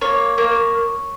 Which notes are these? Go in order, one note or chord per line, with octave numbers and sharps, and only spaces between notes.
A#3 C#5
A#3